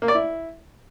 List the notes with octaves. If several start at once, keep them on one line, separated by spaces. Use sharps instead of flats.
A#3
D5
E4